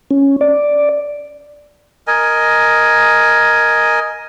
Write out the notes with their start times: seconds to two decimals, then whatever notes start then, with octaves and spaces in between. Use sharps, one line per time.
0.11 C#4
0.41 D5
2.07 A#4 D#5 G#5